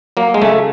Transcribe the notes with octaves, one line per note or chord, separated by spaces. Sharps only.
F#3 A#3
G#3
C#3 A3